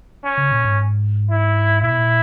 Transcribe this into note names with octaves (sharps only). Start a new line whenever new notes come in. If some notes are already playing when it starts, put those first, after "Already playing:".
C#4
C#3
A#2
G#2
E4
A#2 E4
B2
A#2